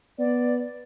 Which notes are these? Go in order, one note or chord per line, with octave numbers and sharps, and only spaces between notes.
B3 D5